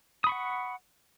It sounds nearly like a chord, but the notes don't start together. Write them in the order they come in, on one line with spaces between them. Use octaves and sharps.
D#6 B5 C#6 F#5